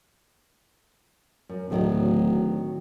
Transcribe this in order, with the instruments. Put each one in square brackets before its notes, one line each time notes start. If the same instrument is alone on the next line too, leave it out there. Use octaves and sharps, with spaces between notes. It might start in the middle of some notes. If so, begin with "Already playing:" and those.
[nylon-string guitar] F#2
[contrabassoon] D1 [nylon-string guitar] A2 D#3 F#3